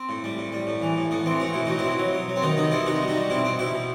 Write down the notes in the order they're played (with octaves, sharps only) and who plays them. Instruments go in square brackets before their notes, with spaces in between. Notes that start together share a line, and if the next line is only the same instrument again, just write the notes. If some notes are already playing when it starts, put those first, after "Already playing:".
Already playing: [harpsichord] C4
A2
G3
A2
G3
A2
E3
A2
A2 B3
E3 C4
A2 F#4
B2 E4
F#3 D#4
C4 E4
B2
F#3
F#3
F#3
C4
D#3 B3 D#4
C3 B3 D#4
G3 C4 E4
C3 D#4 F#4
G3
D#4 F#4
G3
B2 C4 E4
B2 C4
B2 E4 G4
B2